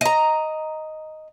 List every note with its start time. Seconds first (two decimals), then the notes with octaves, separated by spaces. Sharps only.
0.01 D#5 A#5